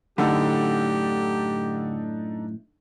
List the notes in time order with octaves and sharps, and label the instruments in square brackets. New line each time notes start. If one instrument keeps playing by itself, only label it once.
[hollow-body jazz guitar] F#2 A2 [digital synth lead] D3 [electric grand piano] D4 D#4 A4 [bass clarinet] G4